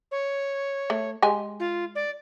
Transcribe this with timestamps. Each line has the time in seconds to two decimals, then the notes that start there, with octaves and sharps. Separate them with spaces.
0.11 C#5
0.90 A3
1.23 G#3 G4 G#5
1.60 F4
1.95 D5